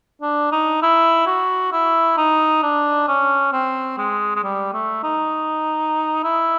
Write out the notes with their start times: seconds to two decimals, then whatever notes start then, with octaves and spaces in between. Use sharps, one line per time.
0.22 D4
0.52 D#4
0.82 E4
1.27 F#4
1.72 E4
2.17 D#4
2.63 D4
3.08 C#4
3.52 C4
3.98 G#3
4.36 G#3
4.43 G3
4.73 A3
5.03 D#4
6.24 E4